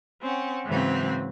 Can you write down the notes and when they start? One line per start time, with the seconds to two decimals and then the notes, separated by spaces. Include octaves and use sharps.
0.22 C4 C#4 F#5
0.65 G#2 C#3 E3 F#3 C4